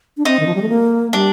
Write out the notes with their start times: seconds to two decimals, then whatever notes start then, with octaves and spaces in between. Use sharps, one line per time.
0.17 D4
0.25 C4 D#4
0.39 D#3
0.47 F3
0.55 G3
0.62 A3
0.69 A#3
1.13 G3 D4